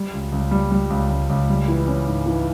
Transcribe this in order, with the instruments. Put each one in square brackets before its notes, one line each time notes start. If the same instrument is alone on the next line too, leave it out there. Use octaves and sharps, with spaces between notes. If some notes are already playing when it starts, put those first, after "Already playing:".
Already playing: [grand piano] G3
C#2
C#2
G3
G3
C#2
C#2
C#2
G3
E3
C#4
G#2
E3